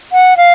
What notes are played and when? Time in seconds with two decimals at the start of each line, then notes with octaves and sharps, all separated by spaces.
0.12 F#5
0.37 F5